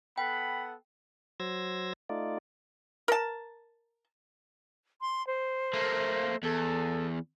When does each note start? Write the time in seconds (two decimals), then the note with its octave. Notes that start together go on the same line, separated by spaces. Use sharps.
0.18 B3 A4 F#5 G5 B5
1.40 F#3 C5 E6 G#6 A#6
2.09 A3 D#4 F4 D5
3.08 A#4 A5
5.01 C6
5.27 C5
5.74 A3 A#3
6.43 E2 A4